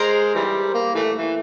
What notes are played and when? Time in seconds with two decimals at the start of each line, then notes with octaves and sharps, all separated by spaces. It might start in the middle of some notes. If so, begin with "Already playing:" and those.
Already playing: G#3 A#4 C5
0.35 E3 G3
0.74 A#3
0.95 E3 A3
1.15 E3